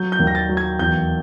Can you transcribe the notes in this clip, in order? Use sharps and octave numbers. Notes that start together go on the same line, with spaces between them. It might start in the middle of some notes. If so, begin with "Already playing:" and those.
Already playing: F#3 G6
G6
D#2
A#6
A6
F#3
G#6
E2 G6